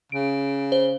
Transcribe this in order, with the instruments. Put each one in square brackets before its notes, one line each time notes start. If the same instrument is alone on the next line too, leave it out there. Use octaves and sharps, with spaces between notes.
[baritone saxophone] C#3 [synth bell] D7
[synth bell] C5